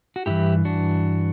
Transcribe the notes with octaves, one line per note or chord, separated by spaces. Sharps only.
F#4
G2 E3 E4 G4
D4 F#4